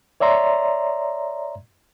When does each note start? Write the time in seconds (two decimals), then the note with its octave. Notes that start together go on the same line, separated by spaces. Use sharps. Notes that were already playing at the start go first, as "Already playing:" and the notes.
0.20 C#5 D5 E5 A#5 C6